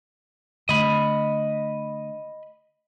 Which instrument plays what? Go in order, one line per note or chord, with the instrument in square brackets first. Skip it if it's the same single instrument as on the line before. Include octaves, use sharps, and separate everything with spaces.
[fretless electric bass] D3 A3 [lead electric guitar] D#5 B5